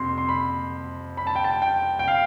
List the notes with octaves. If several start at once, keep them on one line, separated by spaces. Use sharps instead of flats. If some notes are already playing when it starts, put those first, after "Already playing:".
Already playing: F2 C3 C6
C6
B5
B5
A5
G5
A5
G5
G5
F5